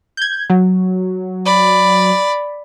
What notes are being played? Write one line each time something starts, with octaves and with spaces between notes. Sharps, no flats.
G6 G#6
F#3
D5 B5